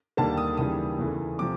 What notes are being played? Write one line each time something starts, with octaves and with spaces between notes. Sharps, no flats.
D#2 D3 G3 A#3 A5
D#6
D#2 C#3 E3 G3 D#6
E2 C#3 E3 A3
C3 F3 D6